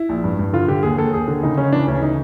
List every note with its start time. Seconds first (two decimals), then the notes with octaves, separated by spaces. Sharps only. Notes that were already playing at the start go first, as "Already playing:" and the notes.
Already playing: E4
0.09 A#1
0.24 G2
0.39 G2
0.53 D3 F4
0.68 D3 G4
0.83 D#2 G#4
0.98 D#2 A4
1.13 D#2 G#4
1.28 D3
1.43 C#3 D#4
1.57 C#3 C#4
1.73 E3 D4
1.87 D2 C#4
1.96 E4
2.02 C#3 D#4